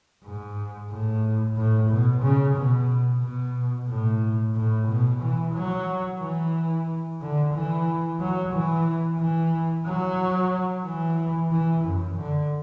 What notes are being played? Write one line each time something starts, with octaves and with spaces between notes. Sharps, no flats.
G#2
A2
A2
B2
C#3
B2
B2
A2
A2
B2
E3
F#3
E3
D3
E3
F#3
E3
E3
F#3
E3
E3
F#2
D3